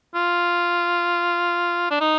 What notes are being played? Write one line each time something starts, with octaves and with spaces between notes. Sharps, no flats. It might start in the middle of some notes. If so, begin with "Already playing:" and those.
F4
D4
D#4